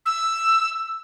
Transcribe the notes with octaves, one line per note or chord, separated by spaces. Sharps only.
E6